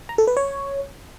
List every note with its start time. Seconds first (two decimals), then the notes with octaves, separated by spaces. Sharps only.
0.09 A#5
0.18 A4
0.27 B4
0.37 C#5